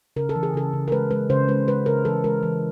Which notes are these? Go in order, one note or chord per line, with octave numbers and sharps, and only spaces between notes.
C#3 A#4
A4
E3
G#4
C#3 A4
C#3
A#4
G#3 B4
G#3 B4
C#3 C5
G#3 B4
G#3 B4
C#3 A#4
E3 A4
G#3 A#4
E3